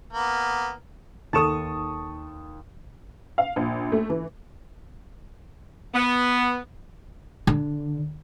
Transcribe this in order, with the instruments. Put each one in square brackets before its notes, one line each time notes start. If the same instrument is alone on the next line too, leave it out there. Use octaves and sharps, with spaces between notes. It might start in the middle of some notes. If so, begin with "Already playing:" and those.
[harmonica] A#3 B3
[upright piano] D#2 E7 [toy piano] D#4 A4 [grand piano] A5 C#6 D#6
[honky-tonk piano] F5
A#1
A3
E3
[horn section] B3
[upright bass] D3